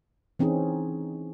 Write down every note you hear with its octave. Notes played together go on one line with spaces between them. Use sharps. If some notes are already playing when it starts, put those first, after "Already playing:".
E3 C4 C#4 D#4 G#4